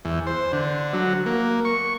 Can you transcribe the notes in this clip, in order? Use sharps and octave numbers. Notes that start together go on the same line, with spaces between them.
E2
C5
D3
F#3
A#3
C#6